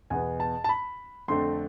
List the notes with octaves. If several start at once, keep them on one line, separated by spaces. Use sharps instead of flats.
E2 B2 B3 G#5
A5
A5
B5
F2 D3 A3 C4 C6